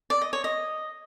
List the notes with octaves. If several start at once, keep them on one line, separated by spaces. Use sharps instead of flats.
D5
D#5
C#5
D#5